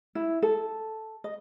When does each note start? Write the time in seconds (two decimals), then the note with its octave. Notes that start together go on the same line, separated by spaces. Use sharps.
0.15 E4
0.42 A4
1.24 D#5